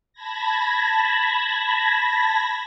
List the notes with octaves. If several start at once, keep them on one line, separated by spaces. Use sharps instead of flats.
A5 B5 G#6 A#6